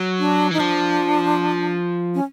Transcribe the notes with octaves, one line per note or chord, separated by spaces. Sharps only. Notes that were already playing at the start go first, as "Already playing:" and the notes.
Already playing: F#3
D4
E3 D#4
F3 D4
C#4